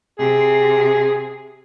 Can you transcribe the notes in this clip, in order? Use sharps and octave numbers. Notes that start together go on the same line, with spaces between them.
C3 G#4